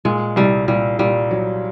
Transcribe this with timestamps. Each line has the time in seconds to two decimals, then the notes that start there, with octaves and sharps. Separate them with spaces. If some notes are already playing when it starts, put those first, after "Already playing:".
0.05 A#2 G#3
0.36 C2 G3
0.68 A#2 G3
0.99 A#2 G3
1.31 F#3